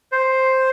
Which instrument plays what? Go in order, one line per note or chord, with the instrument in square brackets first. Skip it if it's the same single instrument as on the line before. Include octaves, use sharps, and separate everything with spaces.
[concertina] C5